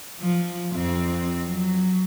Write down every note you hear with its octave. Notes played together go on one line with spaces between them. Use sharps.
F3
F2 C4
F#3